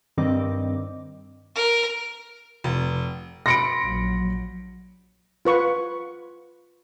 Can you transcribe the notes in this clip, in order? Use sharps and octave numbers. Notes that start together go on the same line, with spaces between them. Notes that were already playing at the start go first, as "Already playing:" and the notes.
G2 D#3 G3 C4 D#5 D6
A#4
F1
B5 C6 A#6 C#7 D7
A#1 F#3
F4 B4 C#6